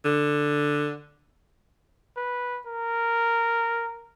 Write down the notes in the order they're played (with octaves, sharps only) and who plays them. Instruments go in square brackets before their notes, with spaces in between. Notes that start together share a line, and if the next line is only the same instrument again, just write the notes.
[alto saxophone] D3
[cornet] B4
A#4